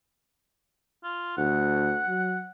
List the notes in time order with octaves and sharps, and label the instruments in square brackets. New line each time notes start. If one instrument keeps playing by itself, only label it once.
[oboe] F4
[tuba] D2 [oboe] F#5
[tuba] F#3